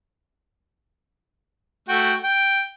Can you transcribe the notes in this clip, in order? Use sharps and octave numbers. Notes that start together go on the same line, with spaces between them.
A3 F#4 G5
G5